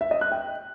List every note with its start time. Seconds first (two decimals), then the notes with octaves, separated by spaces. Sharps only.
0.01 E5
0.11 D#5
0.21 F#6
0.32 G5